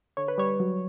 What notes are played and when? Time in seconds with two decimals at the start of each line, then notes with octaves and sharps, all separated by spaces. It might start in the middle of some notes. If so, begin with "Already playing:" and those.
0.17 D3 C#5
0.28 B4
0.38 G3 C#5
0.60 F#3